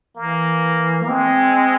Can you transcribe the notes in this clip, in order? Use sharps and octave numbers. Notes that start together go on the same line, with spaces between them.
E3 A#3
A#3
G#3 C4